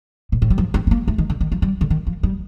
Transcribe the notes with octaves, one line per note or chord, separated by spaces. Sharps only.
A#2
A2
G3
F3
C4
C4
A#3
A3
D#3
D3
D#3
F3
G3
D3
D#3
F3
G3